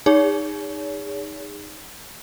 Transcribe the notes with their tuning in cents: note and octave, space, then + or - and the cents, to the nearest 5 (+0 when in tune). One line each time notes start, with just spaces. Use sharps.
D#4 +0 G#4 -30 C#5 +40